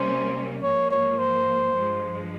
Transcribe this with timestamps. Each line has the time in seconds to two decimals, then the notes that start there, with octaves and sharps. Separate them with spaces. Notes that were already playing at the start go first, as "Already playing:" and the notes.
Already playing: C3 G3 A#3 C#4 C5
0.62 G#2 F3 A#3 C#5
0.91 C#5
1.19 C5
1.76 G2 F3 G#3